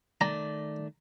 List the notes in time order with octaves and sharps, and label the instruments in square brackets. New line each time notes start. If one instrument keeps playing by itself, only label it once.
[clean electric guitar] D#3 A3 D5 [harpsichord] A#5